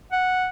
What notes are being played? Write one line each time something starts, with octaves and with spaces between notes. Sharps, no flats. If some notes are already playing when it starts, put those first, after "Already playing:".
F#5